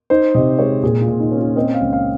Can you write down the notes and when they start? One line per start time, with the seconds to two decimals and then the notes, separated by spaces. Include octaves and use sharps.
0.10 D#4 C5
0.35 C3 D#5
0.59 G#3 C#5
0.83 A#2 G#4
1.02 F4
1.08 A#2
1.20 D#4
1.32 C#4
1.38 F4
1.56 C4 D#5
1.74 F5
1.81 C#2
1.93 F5